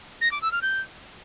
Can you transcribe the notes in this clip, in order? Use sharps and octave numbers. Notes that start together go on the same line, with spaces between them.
A#6
D6
E6
F6
G6